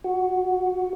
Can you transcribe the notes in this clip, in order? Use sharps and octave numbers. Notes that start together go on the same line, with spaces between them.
F#4